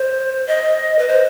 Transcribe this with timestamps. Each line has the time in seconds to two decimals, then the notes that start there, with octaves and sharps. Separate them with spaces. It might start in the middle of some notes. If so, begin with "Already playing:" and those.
Already playing: C5
0.47 D#5
0.99 B4
1.08 C5